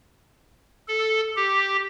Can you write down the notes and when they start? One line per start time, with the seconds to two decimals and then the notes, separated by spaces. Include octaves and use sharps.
0.88 A4
1.36 G4